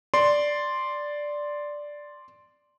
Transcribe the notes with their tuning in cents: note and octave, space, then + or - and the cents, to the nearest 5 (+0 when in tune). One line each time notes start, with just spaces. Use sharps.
D5 +0 C6 +0